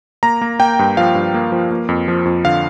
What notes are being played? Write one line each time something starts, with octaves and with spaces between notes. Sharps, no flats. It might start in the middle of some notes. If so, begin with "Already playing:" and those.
A#3 A#5
A#3
A#3 G5
G2
F3 F5
G2
A#3
F3
A#3
F2
F3
F2
D3 F5